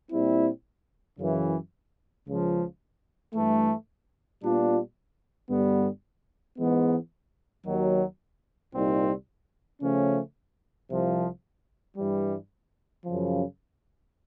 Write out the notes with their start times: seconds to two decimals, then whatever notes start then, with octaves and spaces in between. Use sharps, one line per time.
0.10 A#2 G3 C4 E4
1.18 F#2 C#3 E3
2.26 C#2 C#3 F3
3.34 G2 E3 A3
4.42 A#2 G3 B3 D4 F4
5.50 G2 D3 G3 B3
6.58 G#2 E3 G#3 B3
7.65 D#2 D#3 F#3
8.73 C2 A#2 G3 C4 D#4
9.81 C#3 F3 A3 C#4
10.89 C2 C3 F3
11.96 G2 E3 G3
13.04 F#2 C#3 F3